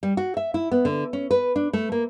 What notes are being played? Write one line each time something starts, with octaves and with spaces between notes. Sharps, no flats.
G3
F#4
E5
E4
B3
D3
C#4
B4
D4
A3
A#3